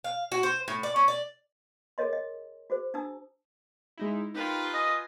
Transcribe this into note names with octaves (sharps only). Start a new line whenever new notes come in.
F5
F#4
C5
A2
D5
C#4
D5
G#4 A#4 C#5 D#5 C6
D#5
F#4 G#4 C5
D4 E4 A5 D#6 E6
G#3 D#4 E4
D#4 F4 G4 A#4 B4
D#5 G#5